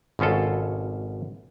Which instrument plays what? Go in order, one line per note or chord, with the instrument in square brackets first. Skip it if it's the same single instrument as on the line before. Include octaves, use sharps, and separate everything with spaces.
[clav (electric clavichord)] G#1 B2 C#4 F4 A4